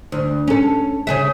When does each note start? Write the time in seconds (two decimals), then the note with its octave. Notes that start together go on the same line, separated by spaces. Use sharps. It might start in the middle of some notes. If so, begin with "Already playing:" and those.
0.12 D2
0.48 C#4 A4
1.07 C#3 G#4 E5